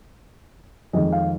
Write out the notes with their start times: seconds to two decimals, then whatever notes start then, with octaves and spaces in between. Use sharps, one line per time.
0.93 F2 D#3 G#3 C4 D#5
1.13 F5